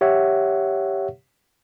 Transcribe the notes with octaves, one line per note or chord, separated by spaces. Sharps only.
G4 C#5 E5 F#5